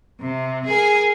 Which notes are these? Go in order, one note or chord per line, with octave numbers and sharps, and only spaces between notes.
C3
G#4 A#4 G#5